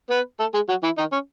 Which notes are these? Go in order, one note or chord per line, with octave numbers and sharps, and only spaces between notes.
B3 B4
A3 A4
G#3 G#4
F#3 F#4
E3 E4
D#3 D#4
C#4